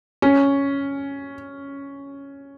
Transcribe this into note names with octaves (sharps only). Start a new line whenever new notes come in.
C#4